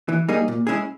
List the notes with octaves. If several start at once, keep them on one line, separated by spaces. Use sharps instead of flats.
E3
G3 A#3 D#4 G#4
A#2
G#3 C#4 E4 G#4